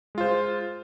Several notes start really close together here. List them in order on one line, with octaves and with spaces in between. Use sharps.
G#3 F4 C5